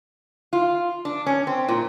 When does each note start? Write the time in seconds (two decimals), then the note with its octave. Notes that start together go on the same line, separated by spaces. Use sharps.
0.53 F4
1.05 D4
1.26 C#4
1.47 C4
1.69 A#2